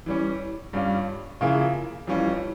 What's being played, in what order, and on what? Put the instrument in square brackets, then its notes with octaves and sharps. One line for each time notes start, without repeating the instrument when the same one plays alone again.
[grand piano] E3 G3 C#4
G2 G3 C#4 F4
C#3 F3 A#3 E4 G#4
F2 E3 G3 C#4 F4